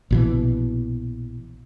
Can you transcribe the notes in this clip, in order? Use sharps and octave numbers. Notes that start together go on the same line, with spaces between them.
A#1 B2 E3